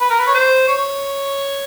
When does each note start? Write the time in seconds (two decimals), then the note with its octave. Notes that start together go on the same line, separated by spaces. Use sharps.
0.01 B4
0.10 A#4
0.19 B4
0.27 C#5
0.34 C5
0.68 C#5